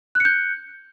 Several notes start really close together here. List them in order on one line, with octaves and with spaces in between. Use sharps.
F#6 C#7 G6